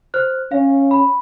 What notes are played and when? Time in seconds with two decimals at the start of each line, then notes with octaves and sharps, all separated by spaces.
0.14 C5 F6 F#6
0.52 C#4 F5
0.91 B5